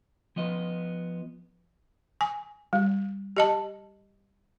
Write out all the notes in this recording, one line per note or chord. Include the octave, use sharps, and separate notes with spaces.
F3 B3 D#5
G#5
G3
G4 D#5 A5